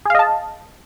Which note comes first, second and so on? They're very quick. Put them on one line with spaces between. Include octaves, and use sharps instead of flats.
G#4 F5 D#5 A5